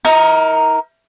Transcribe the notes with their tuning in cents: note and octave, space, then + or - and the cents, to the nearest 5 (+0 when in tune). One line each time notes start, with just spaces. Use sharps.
D#4 +40 A#4 +0